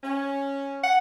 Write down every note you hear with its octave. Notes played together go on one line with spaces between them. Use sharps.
C#4
F#5